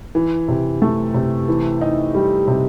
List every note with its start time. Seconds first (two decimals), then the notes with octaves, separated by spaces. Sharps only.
0.15 E3
0.48 C3
0.82 A3
1.14 C3
1.48 E3
1.81 D#4
2.15 G3
2.48 C3